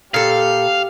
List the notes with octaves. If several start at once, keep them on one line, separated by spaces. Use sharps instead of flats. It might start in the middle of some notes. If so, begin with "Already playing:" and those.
A#2 G4 A4 F5